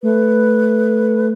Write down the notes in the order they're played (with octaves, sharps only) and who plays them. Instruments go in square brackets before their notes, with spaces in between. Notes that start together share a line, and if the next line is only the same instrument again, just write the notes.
[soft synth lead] A3 [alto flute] B4